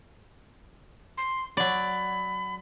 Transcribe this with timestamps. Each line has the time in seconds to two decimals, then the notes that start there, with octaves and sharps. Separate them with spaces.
1.17 C6
1.57 F#3 D5 B5